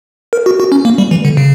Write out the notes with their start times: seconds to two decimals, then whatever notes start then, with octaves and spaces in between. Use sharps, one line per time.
0.33 A#4
0.46 F#4
0.60 F#4
0.72 C#4
0.85 A#3
0.98 G3
1.11 E3
1.25 D3
1.37 C#3